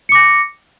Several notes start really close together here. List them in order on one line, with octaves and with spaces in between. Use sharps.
C#7 D6 A#6